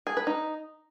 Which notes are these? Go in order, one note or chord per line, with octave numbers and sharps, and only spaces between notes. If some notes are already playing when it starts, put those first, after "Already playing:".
G#4
B4
D#4